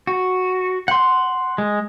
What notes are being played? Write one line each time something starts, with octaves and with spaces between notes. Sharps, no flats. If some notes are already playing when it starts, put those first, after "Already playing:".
F#4
F#5 C6
G#3